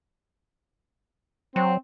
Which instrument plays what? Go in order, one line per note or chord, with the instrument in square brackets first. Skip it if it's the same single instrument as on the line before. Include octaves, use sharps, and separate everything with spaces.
[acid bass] F#3 [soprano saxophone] C4